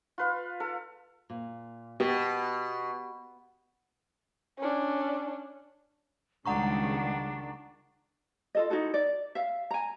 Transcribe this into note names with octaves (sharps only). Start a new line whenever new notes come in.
F4 B4 F5
A4 F5
A#2
B2 B3 G4
C#4 D4
C#2 D#3 G3 G#3 D4 F#5 A#5 C#6
F4 A4 D#5
D#4 E4 F#4 A4
D5
E5 F5
G#5 A#5